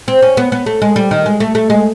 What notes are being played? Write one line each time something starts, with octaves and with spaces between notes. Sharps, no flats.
C4
C#4
B3
B3
A3
G#3
G3
D#3
G#3
A3
A3
G#3